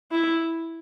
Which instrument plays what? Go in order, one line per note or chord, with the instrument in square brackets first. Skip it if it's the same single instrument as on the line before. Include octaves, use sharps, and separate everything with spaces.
[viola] E4